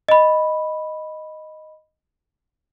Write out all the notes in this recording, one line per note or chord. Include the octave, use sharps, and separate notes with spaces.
D#5 B5